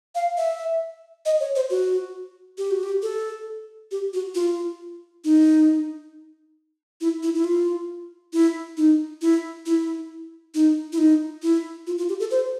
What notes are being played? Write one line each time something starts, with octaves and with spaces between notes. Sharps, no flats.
F5
E5
D#5
C#5
C5
F#4
G4
F#4
G4
A4
G4
F#4
F4
D#4
E4
E4
E4
F4
E4
D#4
E4
E4
D#4
E4
D#4
E4
F4
F4
G4
A4
C5